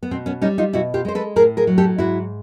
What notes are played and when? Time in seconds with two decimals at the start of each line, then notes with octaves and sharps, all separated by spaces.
0.03 B3
0.11 B2 C4
0.26 B3 C#4
0.41 G3 C#4 D#4
0.58 D#4 F4
0.73 B2 E4 F#4
0.94 F4 G4
1.05 G#3 C5
1.15 A4 B4
1.36 A2 G#4 A#4
1.57 G#4 A#4
1.67 F#3
1.78 G4 A4
1.98 G#2 E4 F#4